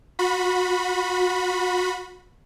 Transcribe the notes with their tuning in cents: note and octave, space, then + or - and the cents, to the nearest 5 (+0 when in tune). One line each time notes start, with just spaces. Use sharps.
F#4 -30 B5 +0